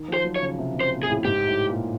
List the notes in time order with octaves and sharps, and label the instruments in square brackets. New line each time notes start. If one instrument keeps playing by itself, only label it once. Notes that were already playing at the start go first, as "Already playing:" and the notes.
Already playing: [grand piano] D#3
F3
[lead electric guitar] C5
[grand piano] F#3
[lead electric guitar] C#5
[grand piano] C#3
C3
C3
[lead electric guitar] C5
[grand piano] A#2
[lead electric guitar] G#4
[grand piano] A2
[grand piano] G#2 [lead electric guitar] G4
[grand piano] A2
A#2